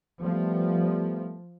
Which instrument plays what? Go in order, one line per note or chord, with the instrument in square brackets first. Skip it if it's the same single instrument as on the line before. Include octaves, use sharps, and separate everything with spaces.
[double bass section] F3 [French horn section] G3 A3 B3